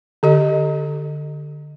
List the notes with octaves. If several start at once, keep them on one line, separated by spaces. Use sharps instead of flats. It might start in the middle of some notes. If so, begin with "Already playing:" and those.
D3 G4 D#5